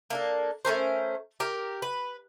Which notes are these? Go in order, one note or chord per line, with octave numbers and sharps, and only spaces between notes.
A#3 D4 A4
A3 C#4 A#4 C5
G4 A#4
B4